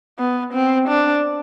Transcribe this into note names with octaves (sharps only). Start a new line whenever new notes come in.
B3
C4
D4